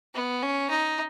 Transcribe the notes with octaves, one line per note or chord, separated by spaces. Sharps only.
B3
C#4
D#4